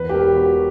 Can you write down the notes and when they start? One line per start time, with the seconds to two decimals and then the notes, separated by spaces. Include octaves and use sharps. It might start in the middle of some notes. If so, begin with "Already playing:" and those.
Already playing: E2 B4
0.09 G4
0.14 E1 A#4
0.35 B2 F#4